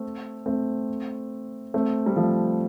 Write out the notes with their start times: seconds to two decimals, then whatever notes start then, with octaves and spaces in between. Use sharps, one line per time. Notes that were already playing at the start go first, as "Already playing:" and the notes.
Already playing: A3 C4
0.46 A3 C4
1.74 A3 C4
2.06 G3
2.16 F3 A3